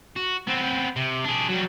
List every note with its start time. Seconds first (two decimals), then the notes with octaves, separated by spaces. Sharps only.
0.16 F#4
0.47 B3 C4
0.96 C3
1.24 D4 G#4
1.49 F#3 G3